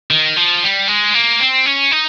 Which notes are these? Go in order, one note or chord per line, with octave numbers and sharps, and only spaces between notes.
D#3
F3
G3
G#3
A#3
C4
C#4
D#4